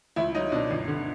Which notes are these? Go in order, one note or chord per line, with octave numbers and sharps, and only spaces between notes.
C#2 E4
F#3 D#4
B2 D4
G1
D3